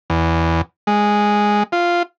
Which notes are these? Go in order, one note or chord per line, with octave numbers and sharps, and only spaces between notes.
E2
G#3
F4